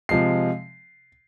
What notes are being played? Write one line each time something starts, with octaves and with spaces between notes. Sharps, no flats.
C3 F3 G#3 C7